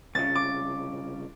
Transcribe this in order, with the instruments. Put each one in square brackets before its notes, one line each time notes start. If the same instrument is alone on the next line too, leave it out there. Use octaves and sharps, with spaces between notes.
[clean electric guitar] C2 C#3 [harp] A6
[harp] D6